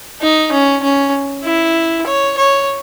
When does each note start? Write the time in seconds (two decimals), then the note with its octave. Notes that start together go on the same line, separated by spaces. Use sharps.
0.21 D#4
0.52 C#4
0.83 C#4
1.44 E4
2.06 C#5
2.37 C#5